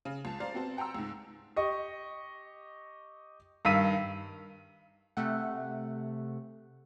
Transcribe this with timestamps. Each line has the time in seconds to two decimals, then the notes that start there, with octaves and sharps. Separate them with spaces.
0.05 C#3
0.25 C#2 A5
0.40 C5 D5 F5 A#5 A6
0.54 B3 C4 F#4 C5 A5
0.77 F#5 G5 A#5 C6 E6
0.95 C#2 G#2
1.56 G4 D#5 C#6
3.65 G2 D#3 F5 E6 B6 D#7
5.17 C3 A3 F#5